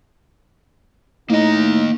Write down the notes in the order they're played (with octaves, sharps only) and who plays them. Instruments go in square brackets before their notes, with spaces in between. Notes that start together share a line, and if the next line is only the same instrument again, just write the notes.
[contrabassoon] A2 [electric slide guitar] A#3 D#5 [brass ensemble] D#4